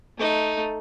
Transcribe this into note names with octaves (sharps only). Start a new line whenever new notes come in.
A3 D#4